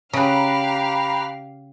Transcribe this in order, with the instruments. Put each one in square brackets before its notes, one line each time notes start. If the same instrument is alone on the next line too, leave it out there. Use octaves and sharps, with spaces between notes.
[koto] C#3 [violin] G4 F5 [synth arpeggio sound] A#5 B5 F#6